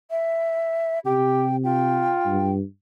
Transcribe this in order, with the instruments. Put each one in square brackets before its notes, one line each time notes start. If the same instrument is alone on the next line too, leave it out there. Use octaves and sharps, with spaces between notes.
[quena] E5
[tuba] C3 [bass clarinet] G4 [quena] G5
[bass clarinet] F4 [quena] G5
[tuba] G2